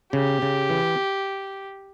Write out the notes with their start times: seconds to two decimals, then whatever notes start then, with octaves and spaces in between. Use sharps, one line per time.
0.13 C#3 G4
0.42 C#3
0.70 E3